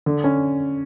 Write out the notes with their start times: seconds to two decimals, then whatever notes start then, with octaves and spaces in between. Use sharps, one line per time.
0.06 D3
0.24 C#4